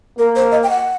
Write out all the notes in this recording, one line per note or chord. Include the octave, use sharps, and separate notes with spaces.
A#3 A#4
C5
D#5
G5
F#5